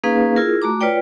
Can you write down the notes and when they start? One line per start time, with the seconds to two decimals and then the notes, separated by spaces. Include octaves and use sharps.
0.04 A#3 C#4 D#4 G#4 B4 F5
0.36 E4 F4 G#4 A#4
0.62 A3 F#4 A#5 D6
0.81 F4 B4 C#5 D5 G5